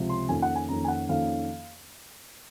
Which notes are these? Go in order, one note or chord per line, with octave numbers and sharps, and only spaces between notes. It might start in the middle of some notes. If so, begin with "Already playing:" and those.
Already playing: C#2 C3 F3 C4
C6
F2 D#3 A#3 C#4 G#5
F#5
G#5
F2 D#3 A#3 C#4 A#5
G#5
F#5
F2 D#3 A#3 C#4 F5